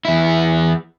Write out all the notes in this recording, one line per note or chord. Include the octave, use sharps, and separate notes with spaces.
E2 E4